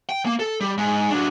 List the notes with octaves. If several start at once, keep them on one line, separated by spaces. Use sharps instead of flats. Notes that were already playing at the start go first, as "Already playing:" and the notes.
G5
A#3
A4
G3
G#2
F#3 D4